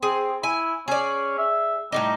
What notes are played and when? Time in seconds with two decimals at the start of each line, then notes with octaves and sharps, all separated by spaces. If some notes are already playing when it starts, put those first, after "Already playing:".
0.03 C4 G#4
0.43 E4 G#5
0.88 C#4 G#4 D5
1.38 E5
1.92 A2 C#3 G3 D#4